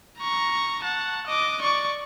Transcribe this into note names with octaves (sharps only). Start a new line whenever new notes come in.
A#5 C#6
F#5 A5
D#5 D6
D5 C#6